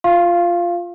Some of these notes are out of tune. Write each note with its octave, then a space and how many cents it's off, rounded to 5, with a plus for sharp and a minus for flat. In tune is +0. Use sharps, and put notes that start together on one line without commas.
F4 +0 F5 -15 C6 +35